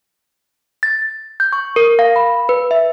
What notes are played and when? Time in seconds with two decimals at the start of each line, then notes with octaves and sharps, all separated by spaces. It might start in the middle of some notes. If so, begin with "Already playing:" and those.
0.83 A6
1.40 G6
1.53 C#6
1.76 A#4
1.99 F5
2.16 B5
2.49 B4
2.71 E5